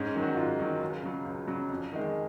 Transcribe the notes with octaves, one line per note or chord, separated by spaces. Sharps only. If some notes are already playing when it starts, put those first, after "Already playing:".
Already playing: G#2 C#4
D#3 F#3
F#4
G#2 F4
D#3 F#3
C#2
C#3 F#3
C#2
C#3 F#3
F2
D#3 G#3